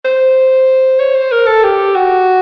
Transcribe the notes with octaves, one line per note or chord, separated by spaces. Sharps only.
C5
C#5
C5
A#4
A4
G4
F#4